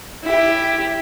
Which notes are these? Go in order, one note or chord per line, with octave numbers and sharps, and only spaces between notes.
E4 G4